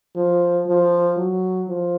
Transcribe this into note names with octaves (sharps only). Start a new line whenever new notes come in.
F3
F3
F#3
F3